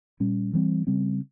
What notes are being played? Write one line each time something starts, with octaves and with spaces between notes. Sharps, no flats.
A#2 G3 C#4
E3 G3 C4
C#3 G3 C4